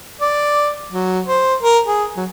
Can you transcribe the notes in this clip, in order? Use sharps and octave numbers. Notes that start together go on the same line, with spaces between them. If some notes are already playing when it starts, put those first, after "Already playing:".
D5
F#3
C5
A#4
G#4
F#3